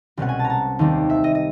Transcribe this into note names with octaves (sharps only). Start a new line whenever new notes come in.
C2 B2 G#3 C#4 F#5
G#5
A5
A#5
A5
D#2 D#3 G3 C4
E5
D#5
D#5